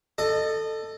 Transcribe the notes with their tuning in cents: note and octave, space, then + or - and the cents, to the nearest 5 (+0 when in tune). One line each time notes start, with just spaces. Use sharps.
A4 +10 D#5 -25